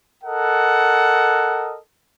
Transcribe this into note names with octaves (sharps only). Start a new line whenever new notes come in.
A4 A#4 D#5 F#5